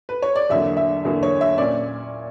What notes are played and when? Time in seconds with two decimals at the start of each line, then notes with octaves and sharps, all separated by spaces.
0.09 B4
0.22 C#5
0.36 D5
0.49 E2 D3 F#3 A#3 E5
0.77 E5
1.04 E2 D3 F#3 A#3
1.23 C#5
1.41 E5
1.58 A#2 A#3 C#4 D5